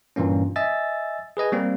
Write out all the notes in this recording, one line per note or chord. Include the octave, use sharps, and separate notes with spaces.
G2 A#2 E3 A#3 C#4
D#5 E5 G#5 E6 A6
G#4 B4 D#5 G#5
G3 A#3 C4